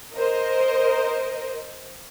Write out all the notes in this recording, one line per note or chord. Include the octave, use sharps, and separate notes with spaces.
A#4 C5 D#5